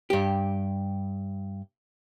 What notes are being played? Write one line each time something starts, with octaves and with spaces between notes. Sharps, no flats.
G2 G4